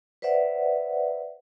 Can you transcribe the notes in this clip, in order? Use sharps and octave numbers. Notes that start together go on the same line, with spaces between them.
B4 C5 D5 E5 F#5